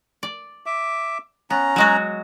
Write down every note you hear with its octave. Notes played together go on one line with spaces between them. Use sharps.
D5
E5 D6
B3 C#4 A#5
F#3 G#3 F#4